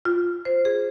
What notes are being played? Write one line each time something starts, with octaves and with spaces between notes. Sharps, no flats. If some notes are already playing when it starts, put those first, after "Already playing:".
F4
C5
G#4